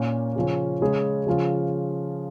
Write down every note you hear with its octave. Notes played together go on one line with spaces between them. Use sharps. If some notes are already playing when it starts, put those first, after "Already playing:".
Already playing: A#2 A#3 C#4
C#3 F3 C#4
C#3 G#3 C#4 G#4
C#3 F3 C#4 F4